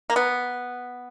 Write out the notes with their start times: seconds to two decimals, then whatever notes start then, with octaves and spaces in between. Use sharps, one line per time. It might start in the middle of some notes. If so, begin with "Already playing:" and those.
0.10 A#3
0.16 B3